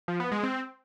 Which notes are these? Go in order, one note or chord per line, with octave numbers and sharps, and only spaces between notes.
F3
B3
G#3
C4